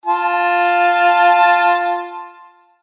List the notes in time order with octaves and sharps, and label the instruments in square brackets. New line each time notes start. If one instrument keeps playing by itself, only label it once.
[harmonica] F4 A5